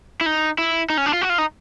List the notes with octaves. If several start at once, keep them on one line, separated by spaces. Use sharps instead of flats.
E4
D#4
E4
D#4
C#4
D4
F4
F#4
F4
D#4